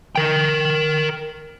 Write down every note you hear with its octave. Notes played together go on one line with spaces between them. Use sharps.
A#4 G5